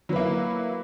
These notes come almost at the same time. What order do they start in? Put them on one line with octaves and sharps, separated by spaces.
F#3 B4 A#3 E4